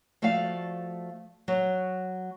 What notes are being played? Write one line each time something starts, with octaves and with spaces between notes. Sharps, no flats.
F3 A3 F#4 D5 F5
F#3